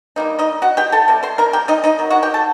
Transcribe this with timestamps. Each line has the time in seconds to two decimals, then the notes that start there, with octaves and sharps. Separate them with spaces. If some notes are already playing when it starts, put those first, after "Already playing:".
0.16 G3 A#3 D#4
0.39 D#4 D#5
0.62 F#4 F#5
0.77 G4 G5
0.92 A4 A5
1.08 C3 G3
1.23 C5 C6
1.38 A#4 A#5
1.53 G4 G5
1.68 D#4 D#5
1.84 D#4 D#5
1.99 D#3 F#3
2.10 F#4 F#5
2.23 G4 G5
2.34 A4 A5